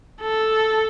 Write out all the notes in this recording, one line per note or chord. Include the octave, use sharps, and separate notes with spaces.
A4